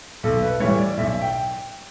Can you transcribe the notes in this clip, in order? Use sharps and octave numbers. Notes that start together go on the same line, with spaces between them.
B1 A4
B4
A2 E3 G3 C#5
D5
B1 E5
G5